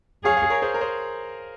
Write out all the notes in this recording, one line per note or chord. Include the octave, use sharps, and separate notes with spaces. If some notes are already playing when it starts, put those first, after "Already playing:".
G#4 C#5 F5
C#5 F5
A#4 C#5
G#4 C5
A#4
G#4 C5